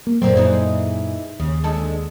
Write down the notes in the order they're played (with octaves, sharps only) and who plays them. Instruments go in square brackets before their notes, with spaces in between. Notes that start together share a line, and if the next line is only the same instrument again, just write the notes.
[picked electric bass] A#3
[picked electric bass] F#1 A#2 F#3 [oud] D3 A#3 C4
[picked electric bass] F#2 A#2 [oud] E3 G#3 D#4
[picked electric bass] D#2 [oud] C#3
[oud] D2 G#3 A4